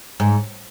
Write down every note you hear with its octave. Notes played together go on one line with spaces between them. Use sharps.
G#2